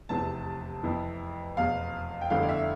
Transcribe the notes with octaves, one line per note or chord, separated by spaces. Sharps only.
F1 E2 C3 E3 A5
F2 E3 B3 E4
F1 E2 B2 F5
G5
G1 F2 D3 A3 E4 F5
D5
E5